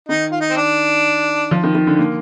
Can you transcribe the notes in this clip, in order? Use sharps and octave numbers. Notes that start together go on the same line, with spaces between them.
D#3 D#4
F4
D#4
C4
D4
F3
D#3
D#3
D3
A#3